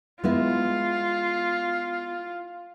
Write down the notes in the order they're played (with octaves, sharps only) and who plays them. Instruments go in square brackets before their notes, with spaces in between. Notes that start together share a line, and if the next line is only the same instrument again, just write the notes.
[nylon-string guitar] G#3 B3 E4 [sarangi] F4